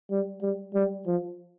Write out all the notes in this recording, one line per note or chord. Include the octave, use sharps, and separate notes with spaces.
G3
G3
G3
F3